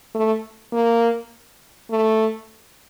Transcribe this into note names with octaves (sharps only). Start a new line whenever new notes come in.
A3
A#3
A3